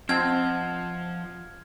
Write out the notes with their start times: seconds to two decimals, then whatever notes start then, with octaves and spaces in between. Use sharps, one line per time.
0.09 F3 C4 D#5 F#5 A5 F6 G#6